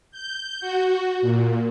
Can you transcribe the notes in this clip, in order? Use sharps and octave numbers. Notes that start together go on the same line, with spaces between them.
G6
F#4
A#2